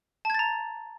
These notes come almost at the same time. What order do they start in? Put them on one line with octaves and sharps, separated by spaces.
A5 G#6 A6 A#5